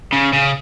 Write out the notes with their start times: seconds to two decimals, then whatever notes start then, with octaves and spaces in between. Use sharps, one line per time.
0.13 C#3
0.33 C#3